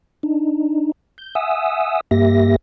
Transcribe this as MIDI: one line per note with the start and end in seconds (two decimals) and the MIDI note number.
0.23 0.92 62
0.23 0.92 63
1.18 1.35 91
1.35 2.01 76
1.35 2.01 78
1.35 2.01 80
1.35 2.01 87
1.35 2.01 88
2.11 2.56 43
2.11 2.56 58
2.11 2.56 67
2.11 2.56 76
2.11 2.56 94